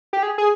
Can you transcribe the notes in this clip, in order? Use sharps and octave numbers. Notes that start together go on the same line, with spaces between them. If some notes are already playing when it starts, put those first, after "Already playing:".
G4
G#4
G#4